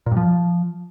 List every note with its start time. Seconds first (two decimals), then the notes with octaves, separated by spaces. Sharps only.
0.06 A#2
0.12 G2
0.17 F3